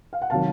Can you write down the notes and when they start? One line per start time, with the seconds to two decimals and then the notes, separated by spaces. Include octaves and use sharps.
0.13 F5
0.22 F#5
0.30 C3 D#3 F#3 F5 A5